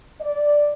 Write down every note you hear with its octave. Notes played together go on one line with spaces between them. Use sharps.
D5